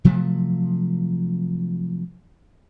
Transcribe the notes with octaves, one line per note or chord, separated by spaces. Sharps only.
C3 F3 F#3 A3